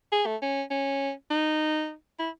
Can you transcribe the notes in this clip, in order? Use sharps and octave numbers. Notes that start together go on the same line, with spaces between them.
G#4
A3
C#4
C#4
D#4
E4